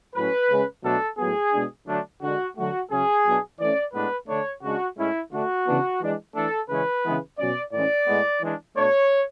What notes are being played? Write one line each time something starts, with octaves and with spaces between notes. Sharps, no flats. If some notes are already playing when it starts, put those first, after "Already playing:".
A2 F#3 C#4 B4
C#3 G#3 C#4
B2 F#3 A3 D4 A4
A2 F#3 B3 G#4
B2 G#3 D4
D3 F#3 A3 D4
D3 G#3 D4 F#4
D3 F#3 A3 F#4
C#3 F#3 C#4 G#4
B2 F#3 B3 D4
E3 A3 C#4 D5
A2 G#3 B3 D4 B4
D3 A3 D4 C#5
C#3 G#3 D4 F#4
A2 G#3 C#4 E4
D3 A3 D4 F#4
C#3 E3 B3 D4
E3 G#3 D4
E3 A3 D4 A4
C#3 E3 G#3 C#4 B4
C#3 E3 G#3 B3
B2 F#3 C#4 D5
A2 E3 G#3 C#4 D5
A2 G#3 B3
E3 G#3 D4
B2 A3 D4 C#5